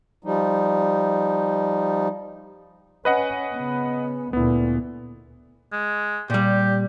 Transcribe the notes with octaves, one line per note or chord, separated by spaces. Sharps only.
F3 G3 D#4
C#4 B4 D#5 F#5
C#3 B3
D2 A#2 B3 E4
G#3
A#2 G3 G4